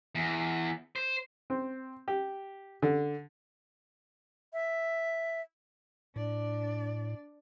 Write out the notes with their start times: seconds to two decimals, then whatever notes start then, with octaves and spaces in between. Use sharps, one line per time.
0.15 E2
0.96 C5
1.50 C4
2.08 G4
2.82 D3
4.53 E5
6.16 A2 D4 D5